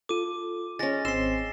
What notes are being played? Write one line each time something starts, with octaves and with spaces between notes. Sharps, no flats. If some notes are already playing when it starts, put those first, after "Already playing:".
F4 A4 D6 D#7
G#3 C#4 A6 A#6
G#1 C4 C6 E6 C7 E7